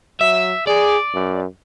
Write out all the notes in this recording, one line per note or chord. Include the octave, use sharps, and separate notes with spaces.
F#3 E5
G#4 D5
F#2